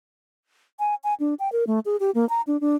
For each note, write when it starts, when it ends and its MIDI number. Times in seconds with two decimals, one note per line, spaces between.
0.79 0.95 80
1.04 1.14 80
1.20 1.34 62
1.39 1.51 79
1.52 1.64 70
1.67 1.80 57
1.86 1.96 68
2.00 2.11 67
2.15 2.28 58
2.29 2.41 82
2.47 2.59 62
2.61 2.76 62